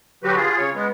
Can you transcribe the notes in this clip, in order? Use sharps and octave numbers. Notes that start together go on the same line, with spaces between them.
D3 F#3 F#4 G4 B4
F4 G#4
C#3 C#5
G#3 B3